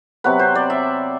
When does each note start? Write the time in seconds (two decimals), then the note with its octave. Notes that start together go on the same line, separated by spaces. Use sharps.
0.24 C3 F#3 B3 B4
0.39 C5
0.55 D5
0.70 E5